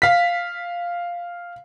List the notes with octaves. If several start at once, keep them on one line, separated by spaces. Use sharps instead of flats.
F5 B6